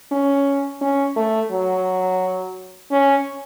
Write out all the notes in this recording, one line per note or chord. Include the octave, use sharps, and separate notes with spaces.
C#4
C#4
A3
F#3
C#4